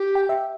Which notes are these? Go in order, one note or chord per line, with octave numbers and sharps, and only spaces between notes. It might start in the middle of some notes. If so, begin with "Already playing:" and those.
Already playing: G4
G5
E5